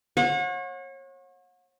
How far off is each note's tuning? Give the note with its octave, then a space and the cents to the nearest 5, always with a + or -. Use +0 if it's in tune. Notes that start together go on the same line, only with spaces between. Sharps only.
C#5 -35 F#5 -35